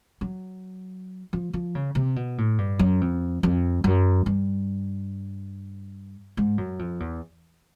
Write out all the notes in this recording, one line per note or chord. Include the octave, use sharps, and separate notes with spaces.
F#3
F3
F3
C#3
C3
B2
A2
G2
F#2
F2
F2
F#2
G2
G#2
F#2
F2
E2